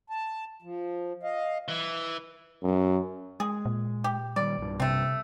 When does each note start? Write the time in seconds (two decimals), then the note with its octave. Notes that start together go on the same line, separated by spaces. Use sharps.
0.10 A5
0.62 F3
1.23 D#5 F5
1.68 E3
2.63 F#2
3.40 G#3 G#4
3.65 A#2
4.04 G4
4.36 D#3 G3 D5
4.58 B1 G2
4.80 C3 A3 C4